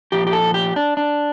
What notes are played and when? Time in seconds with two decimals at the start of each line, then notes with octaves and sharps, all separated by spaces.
0.12 A#2 F3 G4
0.27 G4
0.33 A4
0.54 G4
0.76 D4
0.97 D4